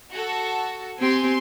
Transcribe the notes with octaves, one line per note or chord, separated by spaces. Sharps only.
F#4 A4
C4 G4 G#5 C6